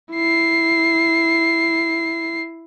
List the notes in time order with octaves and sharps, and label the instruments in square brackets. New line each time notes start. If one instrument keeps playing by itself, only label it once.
[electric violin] E4 C7